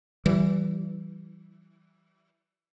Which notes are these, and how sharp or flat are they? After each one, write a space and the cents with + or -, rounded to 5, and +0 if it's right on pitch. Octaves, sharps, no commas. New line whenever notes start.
E3 +0 G3 -30